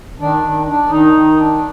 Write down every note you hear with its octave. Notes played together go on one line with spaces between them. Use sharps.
D#3 D4
D#3
D4
D#3 D#4
D#3
D4